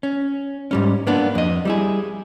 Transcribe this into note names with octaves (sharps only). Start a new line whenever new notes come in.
C#4
G#2 G3 C#4
A#3 B3 D4
F2 D#5
G3 E4 G#4